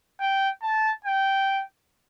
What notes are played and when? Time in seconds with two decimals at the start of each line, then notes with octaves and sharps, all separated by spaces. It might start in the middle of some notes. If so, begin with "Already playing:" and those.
0.20 G5
0.62 A5
1.05 G5